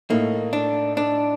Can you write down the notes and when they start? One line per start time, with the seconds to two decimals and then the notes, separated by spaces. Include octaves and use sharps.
0.10 A2 A3 A#3 D#4
0.53 D4
0.97 D4